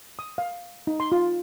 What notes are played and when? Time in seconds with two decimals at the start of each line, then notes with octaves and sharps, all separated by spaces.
0.19 D#6
0.38 F5
0.87 D#4
1.00 C6
1.12 F4